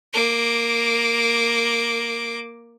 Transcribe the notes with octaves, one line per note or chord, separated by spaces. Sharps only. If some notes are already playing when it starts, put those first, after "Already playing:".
A#3 D6